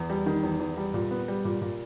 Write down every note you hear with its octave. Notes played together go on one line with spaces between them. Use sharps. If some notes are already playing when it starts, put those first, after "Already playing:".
Already playing: E2
G3
D#3
E2
E2
G3
A#2
B3
G3
A#2
A#2